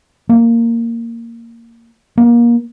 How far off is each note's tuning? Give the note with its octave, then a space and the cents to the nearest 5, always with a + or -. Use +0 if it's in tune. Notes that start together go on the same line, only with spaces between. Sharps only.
A#3 -10
A#3 +25